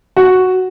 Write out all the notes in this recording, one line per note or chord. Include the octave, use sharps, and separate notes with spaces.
F#4